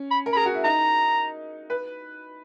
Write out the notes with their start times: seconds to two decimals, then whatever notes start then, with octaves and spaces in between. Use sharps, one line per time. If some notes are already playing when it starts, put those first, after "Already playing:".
Already playing: C#4
0.11 B5
0.26 A#4
0.33 B5
0.35 G#4 A#5
0.45 F#4
0.54 E4
0.64 D#4 A#5
1.70 B4